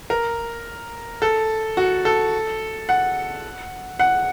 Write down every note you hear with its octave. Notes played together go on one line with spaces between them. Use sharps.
A#4
A4
F#4
A4
F#5
F#5